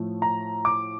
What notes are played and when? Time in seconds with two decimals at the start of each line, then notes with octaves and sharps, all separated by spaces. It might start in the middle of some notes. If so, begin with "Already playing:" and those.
Already playing: A2 F3 A3
0.22 A#5
0.65 D6